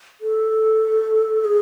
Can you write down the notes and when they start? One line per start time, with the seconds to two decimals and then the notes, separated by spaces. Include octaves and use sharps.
0.21 A4
1.40 A4
1.45 G#4